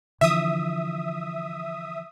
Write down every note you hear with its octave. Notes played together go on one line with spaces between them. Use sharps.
D3 E3 F3 E5 D#6